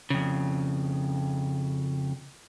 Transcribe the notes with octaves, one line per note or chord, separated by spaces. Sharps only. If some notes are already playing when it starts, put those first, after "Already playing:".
F2 C#3